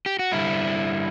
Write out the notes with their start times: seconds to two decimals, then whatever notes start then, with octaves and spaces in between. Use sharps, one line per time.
0.06 G4
0.19 F#4
0.32 G2 D3 G3 E4